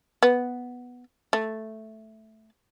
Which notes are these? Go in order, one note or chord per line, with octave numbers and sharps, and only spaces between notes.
B3
A3